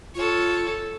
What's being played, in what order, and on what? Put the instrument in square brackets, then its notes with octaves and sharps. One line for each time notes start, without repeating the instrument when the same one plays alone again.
[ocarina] F4 [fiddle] A4 C#5